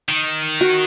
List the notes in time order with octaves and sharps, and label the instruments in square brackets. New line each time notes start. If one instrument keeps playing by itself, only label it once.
[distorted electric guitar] D#3
[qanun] F#4